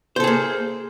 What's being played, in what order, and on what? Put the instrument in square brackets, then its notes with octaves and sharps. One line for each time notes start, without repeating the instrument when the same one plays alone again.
[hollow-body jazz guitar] C5
A4
G#4
A#3